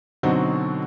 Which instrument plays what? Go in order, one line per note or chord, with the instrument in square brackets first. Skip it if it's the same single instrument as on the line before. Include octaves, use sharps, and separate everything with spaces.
[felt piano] B2 D3 F#3 C4 D#4 F#4